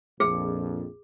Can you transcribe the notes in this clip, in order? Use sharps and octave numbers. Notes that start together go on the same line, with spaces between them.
A#1 F2 G#4